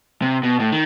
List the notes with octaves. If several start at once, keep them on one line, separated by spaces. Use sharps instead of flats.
C3
B2
A2
D#3